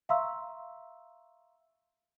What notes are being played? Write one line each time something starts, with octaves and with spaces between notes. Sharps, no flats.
E5 F5 A#5 C6 C#6 E6